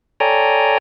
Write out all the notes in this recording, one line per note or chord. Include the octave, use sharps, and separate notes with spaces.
A4 C#5 D5 G5 G#5 A#5